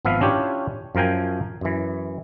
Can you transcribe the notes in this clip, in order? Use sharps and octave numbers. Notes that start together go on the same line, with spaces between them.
G#1 F3 B3 E5 F5
C#4 D4 E4 F4 G4 C#5
F#2 F3 A#4 G5 G#5
F#2 E3